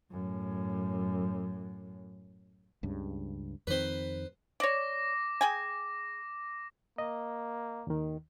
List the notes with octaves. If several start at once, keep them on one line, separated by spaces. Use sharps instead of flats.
F#2 A2
C#2 G2 C#3
F2 D#3 C4 B4 C5
C#5 D5 D6 A#6
G#4 G5 G#5
A#3 D#5
D#2 D#3